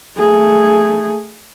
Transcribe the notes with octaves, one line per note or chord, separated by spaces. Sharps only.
A3 G#4